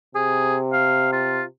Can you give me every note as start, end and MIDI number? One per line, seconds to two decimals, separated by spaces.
0.15 1.43 48
0.15 0.57 68
0.73 1.08 77
1.13 1.44 65